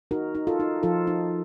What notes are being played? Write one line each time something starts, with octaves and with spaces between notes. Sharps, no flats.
D#4 F#4 A#4
D#4
F4 A4
D#4
F3 F4 A4
D#4